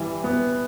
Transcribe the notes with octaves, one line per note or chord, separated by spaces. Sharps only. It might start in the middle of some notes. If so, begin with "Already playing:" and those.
Already playing: E3 G3
B3